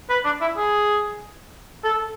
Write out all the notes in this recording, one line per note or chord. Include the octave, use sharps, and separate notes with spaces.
B4
D4
E4
G#4
A4